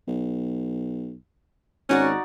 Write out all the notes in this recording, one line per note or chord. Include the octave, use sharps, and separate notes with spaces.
B1
G#1 C#4 D#4 F#4 D5